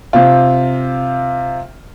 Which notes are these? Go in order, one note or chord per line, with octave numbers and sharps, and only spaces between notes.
C3 C4 F4